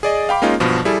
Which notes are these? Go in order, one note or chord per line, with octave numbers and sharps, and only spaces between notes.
G#4 D5 D#5
F5 G5 B5 D6
G#3 A#3 C#4 D#4 F4
B1 G2 B2 F3
G3 E4 G#4 A4